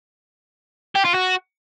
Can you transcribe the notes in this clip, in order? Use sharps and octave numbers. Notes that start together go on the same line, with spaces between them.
G4
F4
F#4